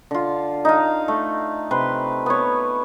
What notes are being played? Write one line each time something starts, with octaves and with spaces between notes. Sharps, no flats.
D3 F4
D#4 F5
A3
C3 B4 C6
B3 C#5